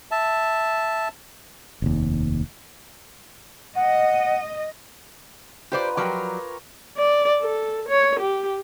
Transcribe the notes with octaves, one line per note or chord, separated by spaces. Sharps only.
E5 A5
F1 D#2
D#5 F#5
F4 G4 B4 C5 D5 A#5
F3 F#3 G4 A#4 C#5 D5
D5
A4
C#5
G4